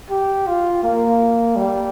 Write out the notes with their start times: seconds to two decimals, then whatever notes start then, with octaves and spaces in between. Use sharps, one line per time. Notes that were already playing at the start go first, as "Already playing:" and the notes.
0.10 G4
0.47 F4
0.83 A#3
1.56 G3